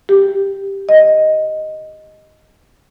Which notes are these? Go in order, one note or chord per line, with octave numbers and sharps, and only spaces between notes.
G4
D#5